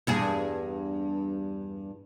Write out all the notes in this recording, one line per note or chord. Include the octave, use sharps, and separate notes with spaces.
E2 G2 G#4